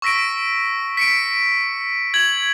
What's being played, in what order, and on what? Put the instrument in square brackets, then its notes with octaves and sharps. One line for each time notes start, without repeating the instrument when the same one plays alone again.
[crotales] C#6 E6 A#6 B6 D7
B6 C#7 D7
G#6 F#7